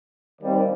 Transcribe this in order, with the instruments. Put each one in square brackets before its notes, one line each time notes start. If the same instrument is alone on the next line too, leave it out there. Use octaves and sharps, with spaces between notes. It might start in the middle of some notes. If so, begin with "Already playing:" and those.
[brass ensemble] D#2 D#3 G3 C4